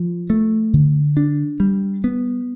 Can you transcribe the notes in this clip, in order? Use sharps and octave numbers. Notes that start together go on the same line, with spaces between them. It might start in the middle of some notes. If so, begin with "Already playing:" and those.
Already playing: F3
A3
D3
D4
G3
B3